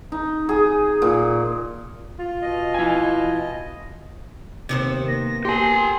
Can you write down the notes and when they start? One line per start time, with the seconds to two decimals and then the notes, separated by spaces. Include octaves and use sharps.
0.12 D#4
0.49 G#4
1.02 A#2
2.19 F4
2.42 B2 D#5
2.74 E4 G#5
4.69 D#2 C3 B3 C5
5.08 A#3 A#6
5.45 G4 G#5 C6